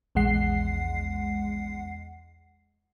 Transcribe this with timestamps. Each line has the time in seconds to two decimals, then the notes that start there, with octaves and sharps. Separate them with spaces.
0.15 A#1 E2 G#3 F#5 C7